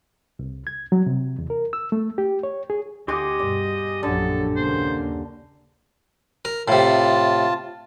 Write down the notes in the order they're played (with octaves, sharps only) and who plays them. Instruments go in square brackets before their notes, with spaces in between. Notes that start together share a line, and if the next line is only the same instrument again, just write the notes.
[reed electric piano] C2
G#6
F#3
C3
E2
A#4
E6
A3
G4
C#5
G#4
[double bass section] D2 [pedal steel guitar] G4 C6 D6 [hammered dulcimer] G#4 F#5 G#5 [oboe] D#5
[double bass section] G2 B2 [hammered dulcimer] D5
[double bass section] A#1 F#2 F#3 [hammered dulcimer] D3 [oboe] A4
[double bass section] D#2 C#3 A#3 [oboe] C5
[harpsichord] A#4
[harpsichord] A2 C3 [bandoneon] F4 A5